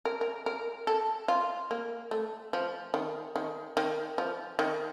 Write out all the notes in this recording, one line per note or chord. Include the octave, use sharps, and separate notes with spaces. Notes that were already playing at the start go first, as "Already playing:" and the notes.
A#4
A#4
A#4
A4
F4
A#3
A3
F3
D#3
D#3
D#3
F3
D#3